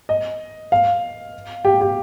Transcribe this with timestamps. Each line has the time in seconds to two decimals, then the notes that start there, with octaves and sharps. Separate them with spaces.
0.09 D#5
0.72 F5
1.65 G4
1.81 G4